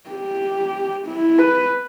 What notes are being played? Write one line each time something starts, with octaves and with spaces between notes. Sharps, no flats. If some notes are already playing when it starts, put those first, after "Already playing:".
G4
E4
B4